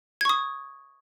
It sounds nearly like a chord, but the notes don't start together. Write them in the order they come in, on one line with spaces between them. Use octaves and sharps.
G#6 C#6 D#6